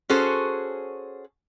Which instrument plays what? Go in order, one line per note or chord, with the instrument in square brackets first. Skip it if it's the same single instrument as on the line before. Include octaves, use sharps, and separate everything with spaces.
[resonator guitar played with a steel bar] C#4 F#4 G#4 A4 C5